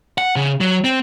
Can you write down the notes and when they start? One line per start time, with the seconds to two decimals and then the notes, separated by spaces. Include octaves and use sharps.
0.18 F#5
0.36 C#3
0.60 F#3
0.84 C4